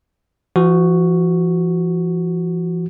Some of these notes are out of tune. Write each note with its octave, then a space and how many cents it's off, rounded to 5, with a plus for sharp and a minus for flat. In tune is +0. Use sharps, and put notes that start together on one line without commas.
F3 -45 F#4 +0